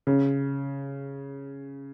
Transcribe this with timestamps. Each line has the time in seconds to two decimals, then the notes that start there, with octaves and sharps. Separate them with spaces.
0.07 C#3